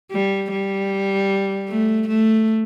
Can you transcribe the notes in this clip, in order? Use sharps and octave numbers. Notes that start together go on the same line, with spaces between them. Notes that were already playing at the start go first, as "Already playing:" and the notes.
G3
G3
A3
A3